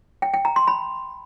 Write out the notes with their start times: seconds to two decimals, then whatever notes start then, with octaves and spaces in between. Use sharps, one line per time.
0.22 G5
0.34 G5
0.45 A#5
0.56 C6
0.67 B5